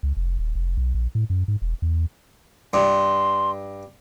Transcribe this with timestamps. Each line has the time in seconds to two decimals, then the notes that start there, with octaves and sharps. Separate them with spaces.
0.03 C#2
0.17 F1
0.39 D#1
0.55 F1
0.78 B1
0.94 A#1
1.15 A2
1.30 F#2
1.48 G#2
1.62 E1
1.82 E2
2.73 G2 C6